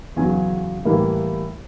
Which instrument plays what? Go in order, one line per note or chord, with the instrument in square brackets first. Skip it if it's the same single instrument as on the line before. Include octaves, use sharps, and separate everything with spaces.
[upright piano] E2 C#3 F#3 G#5
A2 E3 G3 A#3